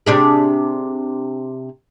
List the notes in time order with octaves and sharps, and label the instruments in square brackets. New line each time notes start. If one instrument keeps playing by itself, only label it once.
[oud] C3 D4 G#4